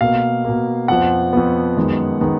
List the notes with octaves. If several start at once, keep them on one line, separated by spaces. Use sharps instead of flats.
B2 A#3 F5
B2 A#3
F2 F3 B3 F#5
F2 F3 B3
F#2 D#3 G#3 B3
D#3 G#3 B3